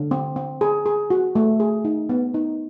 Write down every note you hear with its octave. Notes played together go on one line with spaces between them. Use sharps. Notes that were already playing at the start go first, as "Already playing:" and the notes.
Already playing: D3
C4
C4
G#4
G#4
F#4
A3
G#4
D#4
B3
D#4